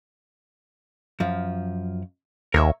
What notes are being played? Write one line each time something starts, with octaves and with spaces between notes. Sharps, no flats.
F#2 F3
D#2 A#4 C#5 E5